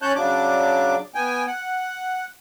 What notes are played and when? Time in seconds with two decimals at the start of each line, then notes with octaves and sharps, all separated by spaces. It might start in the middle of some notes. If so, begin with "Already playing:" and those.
0.02 C#4 C#5 A5 F#6 G6
0.15 C#3 F#3 D4 D6
1.15 B3 G5 G#5
1.47 F#5